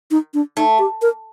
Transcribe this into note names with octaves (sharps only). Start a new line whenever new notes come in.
D#4
D4
A3 D#4
G4
A#4